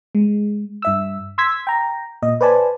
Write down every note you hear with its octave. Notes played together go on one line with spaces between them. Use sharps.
G#3
G2 E5 E6
C6 E6 G#6 B6
G5 A#5
A#2 D#5
B4 C5 D5 G#5 A5 B5